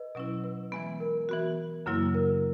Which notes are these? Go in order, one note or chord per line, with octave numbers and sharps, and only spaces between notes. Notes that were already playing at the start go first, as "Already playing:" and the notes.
Already playing: B4 D#5
B2 F#3 C#4 E4
B4
E3 G#3 B3
A#4
E3 B3 F#4
F#2 C#3 F#3 A#3 E4
A#4